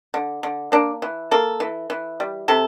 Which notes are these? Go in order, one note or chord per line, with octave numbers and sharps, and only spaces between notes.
D3
D3
A#3 D4
E3
A#3 A4
E3
E3
G3
C3 A4